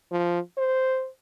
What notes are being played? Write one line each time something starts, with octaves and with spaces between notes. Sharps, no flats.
F3
C5